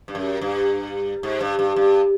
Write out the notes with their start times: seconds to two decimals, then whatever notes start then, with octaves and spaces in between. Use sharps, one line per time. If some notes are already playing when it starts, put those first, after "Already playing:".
0.08 G2
0.15 F#2
0.41 G2
1.23 G#2
1.41 G2
1.59 G2
1.76 G2